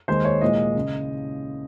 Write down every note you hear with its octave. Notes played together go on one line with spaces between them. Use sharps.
D#2 D#3 G#3 C5
C#5
C2 A#2 G#3 D#5
C#3